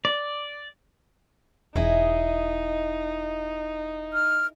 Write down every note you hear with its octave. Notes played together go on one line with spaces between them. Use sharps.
D5
E1 D#4 E4 G#4 D#5
F6